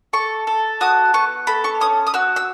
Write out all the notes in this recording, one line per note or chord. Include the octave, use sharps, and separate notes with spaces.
A4 C#6
A4
F#4 D#6
B3 C#6
A4 B5
C#6
C#4 D#6
D#6
F#4 E6
E6